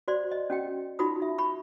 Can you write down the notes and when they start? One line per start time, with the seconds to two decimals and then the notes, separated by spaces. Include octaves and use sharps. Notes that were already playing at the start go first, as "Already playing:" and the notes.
0.08 F#4 C5 D5 C6
0.31 D#5
0.50 C#4 F#4 G5
0.99 D#4 F4 F#4 B5 D#6
1.20 D#4 E5
1.38 B5 C#6